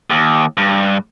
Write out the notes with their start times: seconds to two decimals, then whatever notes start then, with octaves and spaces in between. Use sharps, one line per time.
0.10 D#2
0.57 G2